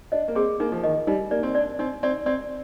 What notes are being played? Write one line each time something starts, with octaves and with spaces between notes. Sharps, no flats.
D4 D#5
A#3
C4 G#4
A#3 D#4
F3
D#3 D#5
G3 D#4
A#3 D5
C4
D4 D5
C4 D#4
C4 D5
C4 D5